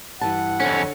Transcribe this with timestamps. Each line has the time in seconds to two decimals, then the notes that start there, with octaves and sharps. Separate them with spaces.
0.21 G2 E3 F#5 A5
0.60 F2 D3 C#4 C#5